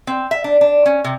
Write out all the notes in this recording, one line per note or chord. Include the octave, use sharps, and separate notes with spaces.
C4
E5
D4
D4
C#4
C3